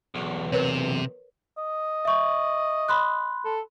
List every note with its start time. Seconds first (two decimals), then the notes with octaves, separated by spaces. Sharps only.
0.15 B1 E2
0.52 C3 A#4 B4 C#5
1.58 D#5
2.05 E5 C#6
2.88 B5 C6 F#6
3.45 A4